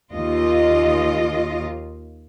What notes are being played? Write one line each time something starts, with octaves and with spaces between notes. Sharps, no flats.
D#2 F4 D#5